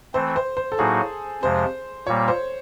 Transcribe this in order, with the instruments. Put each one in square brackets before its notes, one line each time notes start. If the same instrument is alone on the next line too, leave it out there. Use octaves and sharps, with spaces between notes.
[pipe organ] E3 A3 C4 [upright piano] C5
[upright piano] C5
C5
A4
[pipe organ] A2 F#3 A#3 D#4 F#4 [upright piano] G#4
[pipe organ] F2 C3 F3 G#3 [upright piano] C5
[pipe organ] A#2 G3 A#3 [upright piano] C#5
[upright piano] C5